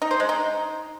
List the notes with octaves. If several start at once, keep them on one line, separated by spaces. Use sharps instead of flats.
D#4
C5
G#3
D#4